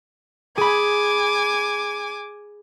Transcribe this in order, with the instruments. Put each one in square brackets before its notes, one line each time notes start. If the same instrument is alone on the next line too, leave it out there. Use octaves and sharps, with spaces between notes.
[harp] G#4 B5 [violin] G#5 D6